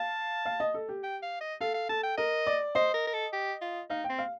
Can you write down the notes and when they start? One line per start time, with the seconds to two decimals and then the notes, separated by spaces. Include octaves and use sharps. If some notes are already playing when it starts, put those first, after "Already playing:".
Already playing: F5 A5
0.46 F5
0.60 D#5
0.74 A4
0.89 G4
1.03 G5
1.22 F5
1.41 D#5
1.61 A4 F5
1.74 F5
1.89 A4 A5
2.03 G5
2.18 A#4 D#5
2.47 D5
2.75 C5 D#5
2.94 A#4
3.07 A#4
3.13 A4
3.33 G4
3.61 F4
3.90 D#4 F5
4.04 G5
4.09 C4
4.19 F5